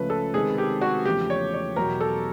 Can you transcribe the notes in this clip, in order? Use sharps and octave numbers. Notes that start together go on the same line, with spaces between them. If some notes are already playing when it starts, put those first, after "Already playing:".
Already playing: C#2 C#3 F3 A3 C#4 B4
A4
C3 D#3 G#3 C4 G#4
G4
F#4
E2 C#3 F3 A3 G4
C#5
C#5
E2 B2 F#3 A#4
A4